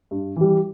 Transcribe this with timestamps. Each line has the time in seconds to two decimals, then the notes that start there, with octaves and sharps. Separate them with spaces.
0.11 G2
0.36 E3 G3